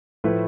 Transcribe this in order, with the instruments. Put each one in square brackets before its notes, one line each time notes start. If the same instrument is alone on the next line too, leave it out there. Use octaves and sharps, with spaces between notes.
[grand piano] A2 F3 A3 E4 B4